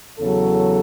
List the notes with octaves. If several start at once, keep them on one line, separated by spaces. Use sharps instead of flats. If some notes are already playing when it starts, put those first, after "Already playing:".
E2 C#3 F#3 A4